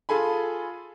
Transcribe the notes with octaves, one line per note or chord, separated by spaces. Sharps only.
F4 G#4 A4 G#5 B5